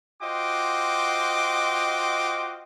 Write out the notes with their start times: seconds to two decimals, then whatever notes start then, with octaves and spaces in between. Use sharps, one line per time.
0.22 F4 F#4 C5 D#5 G5 D6